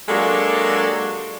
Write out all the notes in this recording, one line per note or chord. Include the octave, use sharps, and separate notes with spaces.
F#3 G#3 A#3 D4 G4 A4